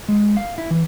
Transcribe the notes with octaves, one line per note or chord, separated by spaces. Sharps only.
G#3
F5
E4
E3